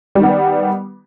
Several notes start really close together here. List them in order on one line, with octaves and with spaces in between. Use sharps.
G3 D#3 B3